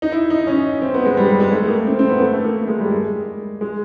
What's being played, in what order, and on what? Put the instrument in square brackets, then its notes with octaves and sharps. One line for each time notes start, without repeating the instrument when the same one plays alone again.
[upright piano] D#4
E4
D#4
C#4
C4
B3
G#3
G3
G3
G#3
A3
A#3
C4
C4
B3
A3
A3
A#3
G#3
G3
G#3
G#3